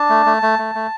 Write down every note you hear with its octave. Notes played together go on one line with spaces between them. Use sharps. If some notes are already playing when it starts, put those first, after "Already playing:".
Already playing: D4 A5
A3
A3
A3
A3
A3